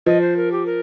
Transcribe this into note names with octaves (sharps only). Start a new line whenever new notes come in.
F3 D#5
C5
A#4
G4
A#4